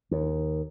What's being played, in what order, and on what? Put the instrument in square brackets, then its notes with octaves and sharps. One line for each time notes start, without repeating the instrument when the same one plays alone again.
[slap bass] D#2